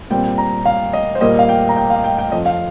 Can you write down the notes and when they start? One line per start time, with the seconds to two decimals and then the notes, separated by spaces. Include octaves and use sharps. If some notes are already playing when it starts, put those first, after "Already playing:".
0.10 A#2 G3 C4 G5
0.38 A#5
0.66 F5
0.93 D#5
1.15 C5
1.21 A#2 G3 A#3 D#5
1.39 F5
1.49 G5
1.69 A#5
1.77 G5
1.90 F5
2.04 G5
2.18 G5
2.32 F2 F3 C4 D#5
2.46 F5